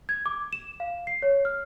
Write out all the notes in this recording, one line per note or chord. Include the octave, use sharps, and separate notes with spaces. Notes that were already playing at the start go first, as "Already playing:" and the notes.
G#6
D6
E7
F5
C7
C#5
F6